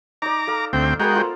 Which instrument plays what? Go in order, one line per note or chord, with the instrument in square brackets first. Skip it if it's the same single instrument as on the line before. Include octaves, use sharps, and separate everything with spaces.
[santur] D#4 D5 [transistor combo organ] A#5 D6
[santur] A4 F5
[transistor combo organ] D2 C4 G5
[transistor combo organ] G#3 F#4 G5 [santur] A#3 B3 A#5
[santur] F4 A4 C5